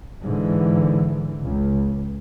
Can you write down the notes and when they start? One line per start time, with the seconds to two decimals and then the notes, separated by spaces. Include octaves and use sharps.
0.24 G#2 D3 E3
1.43 C#2